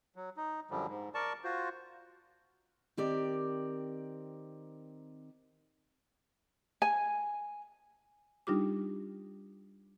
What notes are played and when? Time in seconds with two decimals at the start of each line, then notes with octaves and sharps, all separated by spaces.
0.16 F#3
0.37 D#4
0.71 F#2 D3 F3 G3
0.87 G#2
1.15 A#4 D5 A5 C#6
1.44 F4 F#4 C5
2.97 D#3 C4 G4 A#4 D5
6.82 G#5
8.47 G3 D4 D#4 F4 G4 D6